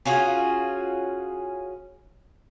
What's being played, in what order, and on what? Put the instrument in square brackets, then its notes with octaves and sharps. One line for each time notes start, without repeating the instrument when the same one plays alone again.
[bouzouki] C#4 F4 F#4 G#4